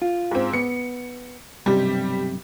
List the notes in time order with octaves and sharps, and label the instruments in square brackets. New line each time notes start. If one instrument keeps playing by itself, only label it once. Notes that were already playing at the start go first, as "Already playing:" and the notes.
[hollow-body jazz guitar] F4
[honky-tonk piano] G#2 C4
[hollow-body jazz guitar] B3 [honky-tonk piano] C#7
[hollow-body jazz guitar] B1 G2 C3 [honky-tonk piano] G3 G4